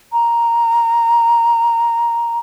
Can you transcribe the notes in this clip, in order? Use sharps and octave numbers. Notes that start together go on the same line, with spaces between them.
A#5